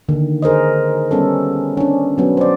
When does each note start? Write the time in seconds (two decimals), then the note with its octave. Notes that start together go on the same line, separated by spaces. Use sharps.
0.09 D3 D#3 A#3
0.42 G#4 A#4 C5 D#5
1.11 G3 B3 C#4 A4
1.77 C#4 D4
2.18 F#3 B3 C#4
2.37 C5 D5